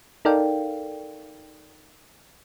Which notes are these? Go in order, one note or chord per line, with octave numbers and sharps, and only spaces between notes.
D#4 A4 A#4 D5 F5 G5